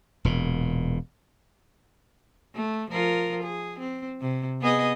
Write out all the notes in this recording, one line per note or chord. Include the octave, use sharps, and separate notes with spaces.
E1 A#2
A3
F3 F4 A#4
G#4
C4
C3
B3 G#4 D#5